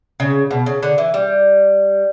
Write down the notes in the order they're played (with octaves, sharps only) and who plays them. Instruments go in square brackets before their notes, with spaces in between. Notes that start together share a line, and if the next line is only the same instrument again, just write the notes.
[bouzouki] C#3
B2
C#3
D3
E3
G3